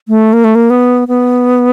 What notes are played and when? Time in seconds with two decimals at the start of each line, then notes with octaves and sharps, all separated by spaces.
0.08 A3
0.33 A#3
0.44 A3
0.55 A#3
0.70 B3
1.08 B3